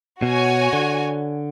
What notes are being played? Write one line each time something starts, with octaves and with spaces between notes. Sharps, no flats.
B2 F#4 C#5 G#5
D3